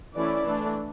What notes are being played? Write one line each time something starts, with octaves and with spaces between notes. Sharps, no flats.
E3 A3 C#4 E4 D5
E3 A3 D4